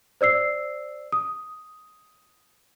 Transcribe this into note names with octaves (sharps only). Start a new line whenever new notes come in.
C5 D5 E6 C7
D#6